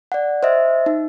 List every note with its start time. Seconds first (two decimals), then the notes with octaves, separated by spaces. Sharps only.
0.12 D5 F#5
0.43 C5 D#5 E5
0.86 D#4